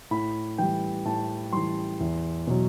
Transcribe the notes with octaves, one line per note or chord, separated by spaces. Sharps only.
A2 B5
E3 G3 G5
A2 A5
E3 G3 C6
E2
B2 F#3